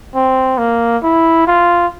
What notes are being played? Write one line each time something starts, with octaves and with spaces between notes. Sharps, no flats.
C4
A#3
E4
F4